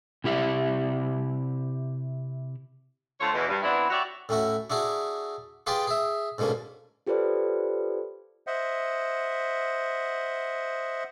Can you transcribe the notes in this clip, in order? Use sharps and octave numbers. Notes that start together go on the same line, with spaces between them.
C3 E4 G4 E5
D3 A3 F4 C5 C#5
E2 B2
G2
E3 B3 C4 D4 E4
F#4 G4 C#5 D5 E5 F#5
A2 C#4 E4 F#4
D4 E4 F#4 G#4
F4 G4 G#4 B4 D5 G5
G#4 E5
G#2 B2 D3 A#3 C#4
F4 G4 A4 B4 C5 D5
C5 D#5 E5 F#5